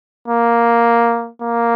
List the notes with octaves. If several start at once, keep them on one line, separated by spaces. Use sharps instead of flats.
A#3
A#3